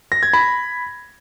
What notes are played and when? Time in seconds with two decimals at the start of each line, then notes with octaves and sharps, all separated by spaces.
0.12 A#6
0.23 G#6
0.33 B5